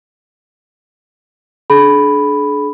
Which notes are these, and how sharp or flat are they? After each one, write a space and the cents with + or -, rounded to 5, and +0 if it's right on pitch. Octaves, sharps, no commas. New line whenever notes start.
D4 +0 G#4 +40 B5 +0